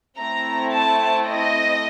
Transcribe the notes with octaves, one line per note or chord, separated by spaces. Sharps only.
A3 C4 E4 A#5
A5
D#5